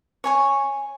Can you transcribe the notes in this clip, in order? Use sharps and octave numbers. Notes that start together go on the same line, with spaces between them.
C#5 G#5 C#6